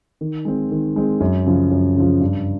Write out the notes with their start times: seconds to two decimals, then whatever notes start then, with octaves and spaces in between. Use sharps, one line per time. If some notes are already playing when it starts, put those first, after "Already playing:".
0.21 D#3
0.45 G#3 C4
0.71 D#3
0.96 G#3 C4
1.20 F#2
1.46 C#3 F3
1.71 F#2
1.97 C#3 F3
2.21 G2